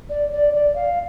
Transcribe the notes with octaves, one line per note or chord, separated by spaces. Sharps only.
D5
D5
D5
F5